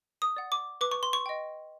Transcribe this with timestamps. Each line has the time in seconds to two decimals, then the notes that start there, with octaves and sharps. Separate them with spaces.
0.22 D#6
0.37 D5 F#5
0.52 D6
0.81 B4 D6
0.91 C#6
1.03 C6
1.13 C#6
1.26 D#5 G5